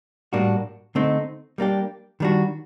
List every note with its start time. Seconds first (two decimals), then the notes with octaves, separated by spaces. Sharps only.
0.33 A2 G3 A#3 D4 F#4
0.95 D3 A3 C4 D#4
1.58 G3 A#3 D4 G4
2.20 D#3 G3 D4 F#4